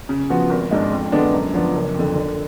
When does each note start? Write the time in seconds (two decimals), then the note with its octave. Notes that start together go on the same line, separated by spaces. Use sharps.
0.09 C#3
0.30 F3 B3 F#4
0.50 G#1
0.71 G#2 G#3 D4
0.92 F2
1.12 D3 G#3 B3 D4
1.33 F#2
1.54 F3 B3 D4
1.74 F#1
1.94 F2 D3
2.15 D3